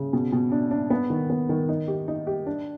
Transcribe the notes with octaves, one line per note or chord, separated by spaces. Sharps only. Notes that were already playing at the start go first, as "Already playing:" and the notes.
Already playing: C#3
B2
B2
D4
D4
B3
D#3
B3
D#3
D#4
G4
D#4
G4
D4